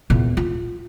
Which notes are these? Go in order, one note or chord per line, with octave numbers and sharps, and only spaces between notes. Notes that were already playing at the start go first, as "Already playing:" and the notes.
E2 A#2
F4